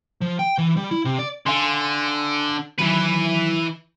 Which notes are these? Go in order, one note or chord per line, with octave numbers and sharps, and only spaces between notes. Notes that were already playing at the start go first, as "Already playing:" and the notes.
F3
G5
E3
G3
E4
C3
D5
D3 F5 G#5 C6
D#3 E3 F#3 B4